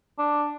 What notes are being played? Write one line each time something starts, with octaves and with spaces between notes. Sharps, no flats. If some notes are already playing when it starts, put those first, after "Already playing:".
D4